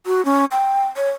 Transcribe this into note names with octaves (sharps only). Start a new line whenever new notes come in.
F#4
C#4
G5
C#5